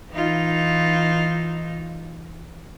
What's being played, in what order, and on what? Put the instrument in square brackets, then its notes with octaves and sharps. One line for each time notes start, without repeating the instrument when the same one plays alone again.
[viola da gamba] E3 D#4 F4